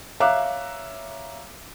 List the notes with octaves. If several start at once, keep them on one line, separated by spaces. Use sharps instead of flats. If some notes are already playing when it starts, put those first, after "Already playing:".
C#5 E5 F5 A#5 D6 F#6